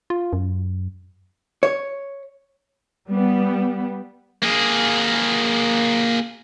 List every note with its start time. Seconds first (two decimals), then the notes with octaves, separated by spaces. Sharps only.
0.10 F4
0.33 F#2
1.63 C#5
3.09 G3 B3
4.42 A#3 G#4